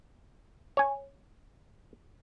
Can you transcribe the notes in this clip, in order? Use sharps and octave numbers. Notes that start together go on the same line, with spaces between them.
C#5 G#5